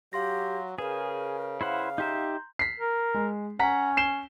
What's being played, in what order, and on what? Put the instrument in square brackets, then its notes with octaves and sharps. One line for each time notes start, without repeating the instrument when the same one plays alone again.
[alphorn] F#3 [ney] G4 [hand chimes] F5 C6 A#6
[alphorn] C#3 [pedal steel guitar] G#4 [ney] A#4 [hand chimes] B4 C#5
[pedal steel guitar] E4 C5 F#5 [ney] F5
[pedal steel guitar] D#4 G4 E5 [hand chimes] A#5 C6 G6
[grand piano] B6 C7
[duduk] A#4
[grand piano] G#3
[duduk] C#4 [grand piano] F#5 A#5 B6
[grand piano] C7 E7 G7